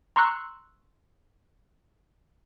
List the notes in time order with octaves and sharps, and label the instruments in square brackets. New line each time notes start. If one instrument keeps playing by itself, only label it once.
[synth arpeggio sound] A#5 C6 C#6 E6 F#6